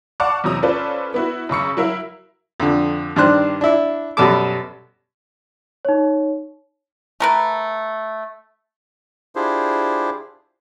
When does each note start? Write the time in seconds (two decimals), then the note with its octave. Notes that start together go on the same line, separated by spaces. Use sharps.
0.20 D5 F5 F#5 A5 C#6 D6
0.44 E2 C3 F#3 A#5 D#6
0.63 C#4 F4 A4 B4 C5 D5
1.14 B3 E4 F#4
1.49 F#2 C#3 C#6 C#7
1.77 F#3 E4 A#4 E5 F5
2.60 F2 D3
3.16 G2 D#3 D4 C5 F#6
3.61 D4 E4
4.17 F#2 B2 G3 A4 A5 D6
5.85 D#4 C#5
7.20 A3 A#4 B4
9.36 D4 E4 F4 G4 G#4 C5